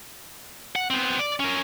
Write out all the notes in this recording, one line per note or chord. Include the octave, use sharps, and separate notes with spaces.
F#5
B3 C4
D5
C#4 A#4